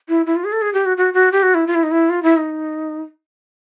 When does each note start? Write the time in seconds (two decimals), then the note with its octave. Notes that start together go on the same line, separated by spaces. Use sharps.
0.09 E4
0.26 E4
0.36 F4
0.44 G#4
0.53 A4
0.62 G#4
0.74 G4
0.86 F#4
0.97 F#4
1.14 F#4
1.32 G4
1.43 F#4
1.54 E4
1.67 F4
1.75 E4
1.83 D#4
1.91 E4
2.10 F4
2.23 E4
2.37 D#4